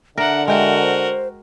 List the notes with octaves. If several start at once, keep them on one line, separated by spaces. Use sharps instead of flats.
D3 D4 A#4 E5 F#5
G#3 F#4 A#4 E5 G5
C5